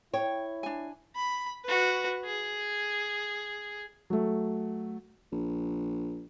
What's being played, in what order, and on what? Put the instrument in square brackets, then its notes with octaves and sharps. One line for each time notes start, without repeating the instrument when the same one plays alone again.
[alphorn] E4 [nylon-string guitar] C#5 [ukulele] G5
[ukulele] D4 G#5
[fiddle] B5
F#4 B4
G#4
[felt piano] F#3 A3
[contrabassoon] A#1